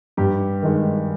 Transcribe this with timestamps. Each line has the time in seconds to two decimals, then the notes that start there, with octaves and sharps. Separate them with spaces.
0.17 G2 G4
0.63 D#3 G#3